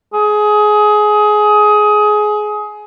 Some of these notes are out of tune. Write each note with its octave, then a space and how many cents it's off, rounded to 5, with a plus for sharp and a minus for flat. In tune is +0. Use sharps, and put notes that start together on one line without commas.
G#4 +20